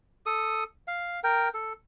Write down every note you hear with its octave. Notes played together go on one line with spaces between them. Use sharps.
A4 D#6
F5
A#4 G5
A4